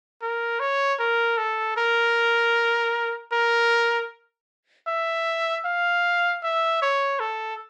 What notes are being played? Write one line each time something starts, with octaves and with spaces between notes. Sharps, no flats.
A#4
C#5
A#4
A4
A#4
A#4
E5
F5
E5
C#5
A4